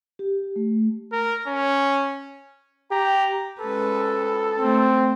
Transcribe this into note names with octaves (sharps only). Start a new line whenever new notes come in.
G4
A3
A#4
C#4
G4 A#5
G#3 C#4 A4 B4
A3 C4